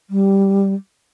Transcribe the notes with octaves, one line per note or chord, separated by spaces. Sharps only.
G3